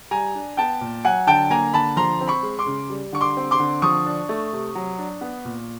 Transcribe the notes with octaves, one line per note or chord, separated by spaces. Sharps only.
G3 G#5 A#5
D4
B3 G5 A5
A#2
F#3 F#5 G#5
D3 G5 A5
A#3 G#5 A#5
D3 A5 B5
F3 A#5 C6
C4
B5 C#6
G#3
C6 D6
C#3
G3
D3 C#6
C6 D6
C4
C6 D6
D3
F3 C#6 D#6
D4
A3
C3
F#3
D4
B3
A#2